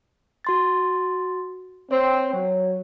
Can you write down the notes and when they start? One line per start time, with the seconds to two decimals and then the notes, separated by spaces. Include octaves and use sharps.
0.45 F#4 C6 A6
1.91 C4 C#5
2.34 F#3